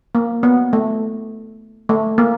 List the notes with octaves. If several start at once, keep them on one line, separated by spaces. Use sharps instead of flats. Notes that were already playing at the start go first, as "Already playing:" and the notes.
A#3
B3
A3
A3
A#3